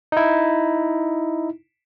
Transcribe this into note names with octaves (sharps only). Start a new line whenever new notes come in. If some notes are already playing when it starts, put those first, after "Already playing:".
D#4 E4